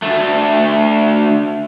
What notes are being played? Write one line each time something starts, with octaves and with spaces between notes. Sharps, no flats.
D2 A3